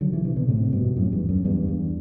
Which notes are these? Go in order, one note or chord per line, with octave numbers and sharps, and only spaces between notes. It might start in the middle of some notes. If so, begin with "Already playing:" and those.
D3 F#3
C3 E3
C3 E3
B2 D3
A2 C3
G2 B2
F#2 A2
E2 G2
F#2
E2 G2
E2